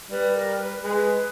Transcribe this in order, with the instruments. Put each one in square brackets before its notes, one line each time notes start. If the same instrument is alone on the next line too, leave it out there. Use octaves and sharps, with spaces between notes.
[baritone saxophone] G3 [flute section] B4
[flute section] A#4
B4
[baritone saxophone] G#3 [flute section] B4